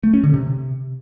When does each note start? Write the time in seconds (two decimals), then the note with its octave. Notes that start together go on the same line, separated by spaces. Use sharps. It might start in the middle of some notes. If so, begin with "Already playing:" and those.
0.04 A3
0.14 C#4
0.24 D3
0.34 C3